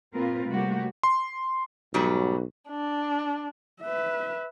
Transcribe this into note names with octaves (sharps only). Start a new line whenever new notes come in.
A#2 A#3 C4 F4 A#4 B4
C3 G3 A3 A#3 F#4 G4
C6
B1 G#2 F#3 G3
D4
B4 E5